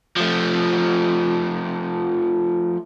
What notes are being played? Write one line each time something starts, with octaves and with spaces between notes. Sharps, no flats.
F3 A3